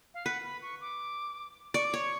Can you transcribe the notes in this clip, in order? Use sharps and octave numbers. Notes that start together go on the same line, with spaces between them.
F5
B4 F#5
B5
C#6
D6
D5 C#6
D6
C#5 C#6